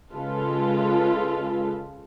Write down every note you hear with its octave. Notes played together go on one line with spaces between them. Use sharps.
C#3 G#3 F4 A4 B4